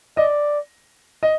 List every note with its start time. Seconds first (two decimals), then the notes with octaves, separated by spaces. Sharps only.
0.17 D5 D#5
1.23 D#5